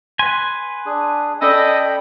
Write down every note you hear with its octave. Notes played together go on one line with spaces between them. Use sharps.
B4 G#5 C6
D4 G#4
C#4 A4 D5 D#5 G5 B5